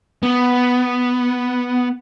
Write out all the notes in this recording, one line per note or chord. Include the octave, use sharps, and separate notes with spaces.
B3